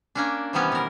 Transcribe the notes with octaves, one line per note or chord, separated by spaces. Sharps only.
A#3 C#4 D4
C3 D#3 E3 G3 B3 C#4
B2 A#4